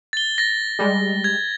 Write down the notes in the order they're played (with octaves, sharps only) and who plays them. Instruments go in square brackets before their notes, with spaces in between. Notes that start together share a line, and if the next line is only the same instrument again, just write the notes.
[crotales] A6 G7
A6 A#6
[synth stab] G3 G#3
[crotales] G#6